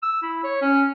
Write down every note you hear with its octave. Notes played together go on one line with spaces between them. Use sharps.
E6
E4
C#5
C#4